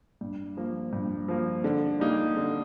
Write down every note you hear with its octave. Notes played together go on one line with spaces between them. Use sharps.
G2
F3 A#3
G2
F3 A#3
D3
G3 A#3 D#4
D3